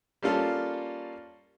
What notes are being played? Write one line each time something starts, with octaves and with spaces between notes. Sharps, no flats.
G3 A#3 C#4 F4 A4